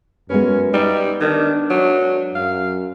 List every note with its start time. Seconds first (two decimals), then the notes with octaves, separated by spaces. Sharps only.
0.30 F#2 G#3 B3 C#4 B4
0.73 G3 D#4
1.21 D#3 D4
1.70 F#3
2.35 F#2 F5